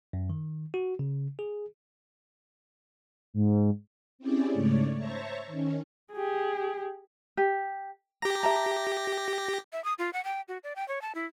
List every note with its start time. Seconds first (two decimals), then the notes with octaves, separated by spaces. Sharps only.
0.13 F#2
0.30 D#3
0.74 F#4
0.99 C#3
1.39 G#4
3.34 G#2
4.19 C4 C#4 E4 G4 G#4 D5
4.53 G#2 C#3 A3 C#5 D5
4.96 C5 C#5 E5 A5 A#5 C#6
5.47 D#3 C#4
6.13 G4 G#4
7.37 G4
8.22 G4 A#5 A#6
8.43 E5 A5 A#5
9.73 E5
9.84 D#6
9.99 F4
10.13 F#5
10.25 G5
10.48 F#4
10.64 D5
10.76 G5
10.88 C#5
11.02 A5
11.15 E4